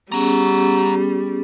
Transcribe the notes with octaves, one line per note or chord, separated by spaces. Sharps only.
G3 B3 C#4 G#4 F#5 A#5